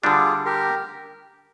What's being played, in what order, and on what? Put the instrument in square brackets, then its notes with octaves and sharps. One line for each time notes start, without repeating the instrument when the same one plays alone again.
[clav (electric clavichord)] D3 G3 D4 [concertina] F4 G#4
[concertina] G4 A#4